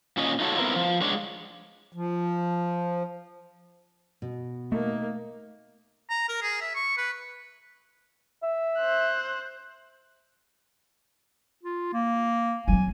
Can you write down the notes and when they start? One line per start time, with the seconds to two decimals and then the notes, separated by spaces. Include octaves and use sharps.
0.17 A#2 C#4 C#5 D#5
0.40 D#4 F4 F#4 A4 C#5
0.58 B3 C4 E4 A#4
0.76 F3
1.01 G#3 D4 C#5
1.92 F3
4.22 B2
4.72 A3 A#3 D#4
6.10 A#5
6.29 A#4
6.42 G#4
6.62 E5
6.75 C#6
6.98 B4
8.43 E5
8.78 C5 F#6
11.63 F4
11.93 A#3
12.68 F#3 C4 G#5